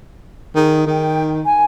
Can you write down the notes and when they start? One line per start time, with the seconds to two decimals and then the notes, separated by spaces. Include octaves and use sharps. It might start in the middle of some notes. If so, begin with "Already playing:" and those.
0.56 D#3 G#4
0.87 D#3 G5
1.45 G#5